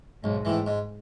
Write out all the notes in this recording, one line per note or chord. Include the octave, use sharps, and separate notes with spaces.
B1 G#2
A2 E3
G#2